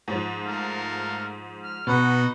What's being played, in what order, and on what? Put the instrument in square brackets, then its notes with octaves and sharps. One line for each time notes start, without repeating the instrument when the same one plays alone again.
[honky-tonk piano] G#2 F3
[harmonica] A3 A#4 F5
F6
[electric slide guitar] B2 [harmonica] D#4 F#4 F#5 [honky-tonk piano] B4